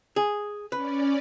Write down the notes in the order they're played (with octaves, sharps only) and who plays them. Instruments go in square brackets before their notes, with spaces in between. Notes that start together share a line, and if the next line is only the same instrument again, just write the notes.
[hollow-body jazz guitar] G#4
[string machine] C#4 D5 [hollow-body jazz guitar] B4